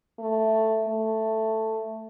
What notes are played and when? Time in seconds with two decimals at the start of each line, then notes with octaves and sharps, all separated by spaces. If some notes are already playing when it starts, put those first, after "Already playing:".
0.19 A3
0.88 A3